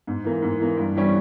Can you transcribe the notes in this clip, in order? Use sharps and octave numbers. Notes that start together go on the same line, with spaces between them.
G#2
E3 A#3
G#2
E3 A#3
G2
E3 G3 C#4